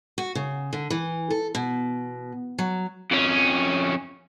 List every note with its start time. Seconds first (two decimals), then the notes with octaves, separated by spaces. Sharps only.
0.18 F#4
0.35 C#3
0.73 D3
0.90 E3
1.30 A4
1.55 B2
2.59 F#3
3.11 F2 C#4